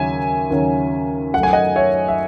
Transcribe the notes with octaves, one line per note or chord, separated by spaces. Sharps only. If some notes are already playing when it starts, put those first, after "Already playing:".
Already playing: D#2 C#3 F#3 C#4 E5 G#5
D#2 C#3 F#3 C#4
F#2 D#3 A3 F#5
G#5
D#5 F#5
C#5 E5
E5